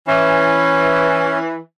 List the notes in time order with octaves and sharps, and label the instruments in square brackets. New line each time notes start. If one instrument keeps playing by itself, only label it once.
[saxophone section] E3 [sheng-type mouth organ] C#4